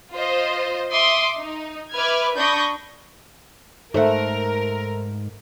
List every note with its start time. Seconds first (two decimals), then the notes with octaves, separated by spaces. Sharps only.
0.12 F4 C5 D#5
0.92 E5 C6 D6 D#6
1.37 D#4
1.94 B4 E5 D6 F6 G#6
2.36 D4 B5 C#6 D#6 G6 A#6
3.94 G#2 A3 A4 A#4 C5 E5 F#5